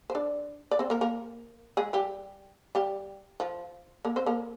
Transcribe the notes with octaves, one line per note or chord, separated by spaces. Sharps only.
C5
D4 D5
D5
C4 C5
A#3 A#4
A#3 A#4
G#3 G#4
G3 G4
G3 G4
F3 F4
A#3 A#4
C4 C5
A#3 A#4